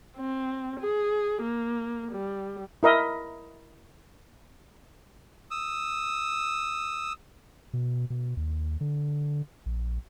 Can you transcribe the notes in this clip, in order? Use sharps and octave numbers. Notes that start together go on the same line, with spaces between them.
C4
G#4
A#3
G3
E4 A#4 D#5 E5
D#6 E6
B2
B2
D#2
D3
A#1